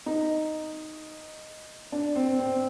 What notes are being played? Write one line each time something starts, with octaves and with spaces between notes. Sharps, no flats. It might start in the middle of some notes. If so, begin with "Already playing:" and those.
D#4
D4
C4
C4